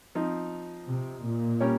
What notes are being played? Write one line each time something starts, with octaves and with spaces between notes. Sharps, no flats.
F3 C4 D#4
C3
A#2
G3 C#4 G4 A#4 C#5